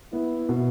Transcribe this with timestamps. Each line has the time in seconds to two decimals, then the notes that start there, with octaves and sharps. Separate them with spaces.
0.13 B3 E4
0.49 B2